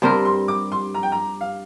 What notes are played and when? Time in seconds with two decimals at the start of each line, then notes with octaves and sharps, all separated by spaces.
0.02 G2 G3 C4 A#4 C6
0.25 C6
0.48 D6
0.72 C6
0.95 A#5
1.03 G5
1.12 A#5
1.41 F5